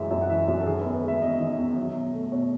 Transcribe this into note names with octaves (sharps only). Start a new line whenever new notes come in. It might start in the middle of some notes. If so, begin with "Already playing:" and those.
Already playing: F#2 E3 G#3 E5
F#2 E5
F#5
E3 E5
F#2 F#4
A4
D#3 G#4
E2 B4
B4
G#3 E5
E2 D#5
D#3
E2
F#3
B2
A3
B2 C#5